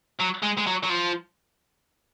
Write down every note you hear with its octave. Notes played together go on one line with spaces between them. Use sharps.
F#3
G#3
G#3
F#3
F#3
F3